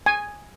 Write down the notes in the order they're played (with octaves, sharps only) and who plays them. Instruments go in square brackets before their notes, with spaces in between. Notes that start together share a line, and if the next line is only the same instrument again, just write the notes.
[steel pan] G#5